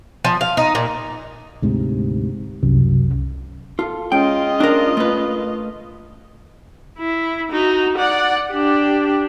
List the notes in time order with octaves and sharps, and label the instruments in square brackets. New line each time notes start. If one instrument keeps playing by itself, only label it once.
[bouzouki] F3
F5
D#4
A#2
[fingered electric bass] D2 G#2 C3
[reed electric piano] C2 [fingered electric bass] F#2
[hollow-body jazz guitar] F4 [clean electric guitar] A4
[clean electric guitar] G#3 C#4 [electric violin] F4 D#5 [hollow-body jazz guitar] G5
[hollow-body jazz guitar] D4 A#4
A3 B4
[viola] E4
D#4 F#4
D5 F#5
D4 G4